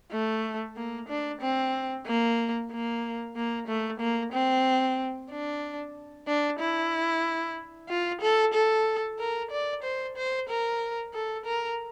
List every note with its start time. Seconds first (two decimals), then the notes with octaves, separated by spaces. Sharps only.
0.12 A3
0.76 A#3
1.08 D4
1.41 C4
2.06 A#3
2.71 A#3
3.36 A#3
3.67 A3
4.00 A#3
4.33 C4
5.30 D4
6.27 D4
6.59 E4
7.89 F4
8.21 A4
8.53 A4
9.19 A#4
9.51 D5
9.83 C5
10.16 C5
10.49 A#4
11.14 A4
11.45 A#4